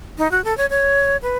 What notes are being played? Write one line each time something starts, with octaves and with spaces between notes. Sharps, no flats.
D#4
F#4
A4
C#5
C#5
B4